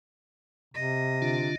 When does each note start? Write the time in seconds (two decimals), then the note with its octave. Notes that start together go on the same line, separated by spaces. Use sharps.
0.74 C3 D#5
1.22 D3 D4 F4